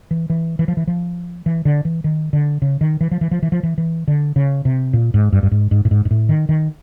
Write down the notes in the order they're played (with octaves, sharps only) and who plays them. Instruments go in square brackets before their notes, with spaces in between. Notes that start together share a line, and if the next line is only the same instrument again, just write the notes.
[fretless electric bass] E3
E3
E3
F3
E3
F3
E3
D3
E3
D#3
D3
C#3
D#3
E3
F3
E3
F3
E3
F3
E3
E3
D3
C#3
C3
A#2
G#2
G2
G2
G#2
G#2
A2
G#2
G#2
A2
D#3
D#3